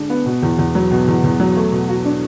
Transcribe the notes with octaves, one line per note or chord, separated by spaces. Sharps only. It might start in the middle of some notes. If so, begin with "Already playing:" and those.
Already playing: D3 G#3 D4
B3
B2
E2
E2
F#3
B2
E2
E2
F#3
A3
B2
F#4
D4